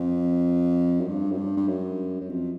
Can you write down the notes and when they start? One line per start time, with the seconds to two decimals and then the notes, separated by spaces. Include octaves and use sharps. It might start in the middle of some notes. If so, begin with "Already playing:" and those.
Already playing: F2
1.00 F#2
1.08 G2
1.31 F#2
1.38 G2
1.57 G2
1.68 F#2
2.21 F#2
2.29 F2